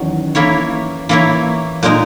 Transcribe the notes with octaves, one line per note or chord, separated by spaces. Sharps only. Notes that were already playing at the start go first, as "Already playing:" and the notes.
Already playing: E2 D#3 F#3 C#4
E3 A#3 E4 A#4 C#5
E3 A#3 E4 A#4 C#5
A#2 G#3 D#4 A#4